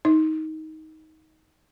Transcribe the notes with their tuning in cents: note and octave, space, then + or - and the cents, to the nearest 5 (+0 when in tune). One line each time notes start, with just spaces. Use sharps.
D#4 +15